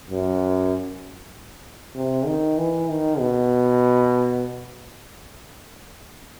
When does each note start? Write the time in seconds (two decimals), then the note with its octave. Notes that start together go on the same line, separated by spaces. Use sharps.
0.10 F#2
1.96 C3
2.26 D#3
2.58 E3
2.89 D#3
3.19 B2